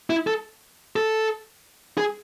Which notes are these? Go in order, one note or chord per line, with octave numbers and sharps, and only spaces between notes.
E4
A4
A4
G#4